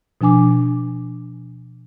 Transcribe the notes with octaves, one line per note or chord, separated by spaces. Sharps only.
B2 F3 D4 G#5 D6